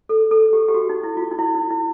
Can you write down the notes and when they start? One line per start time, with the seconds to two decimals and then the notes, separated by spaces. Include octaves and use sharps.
0.09 A4
0.31 A4
0.53 G4
0.68 G4
0.74 F#4
0.89 D#4
1.04 E4
1.17 F4
1.31 D#4
1.39 E4
1.55 D#4
1.71 E4